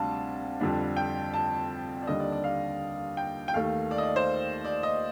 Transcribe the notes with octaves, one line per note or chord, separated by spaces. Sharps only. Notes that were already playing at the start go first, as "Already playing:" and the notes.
Already playing: D2 C3 G3 D4 F5 A5
F2 D3 G3 D4
G5
A5
D5
D#2 D3 G3 D#5
D5
D5
F5
G5
G5
D#2 D#3 A3 F5
D5
D#5
D5
C5
D5
D#5